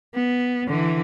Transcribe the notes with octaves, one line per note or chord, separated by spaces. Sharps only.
B3
D3 E3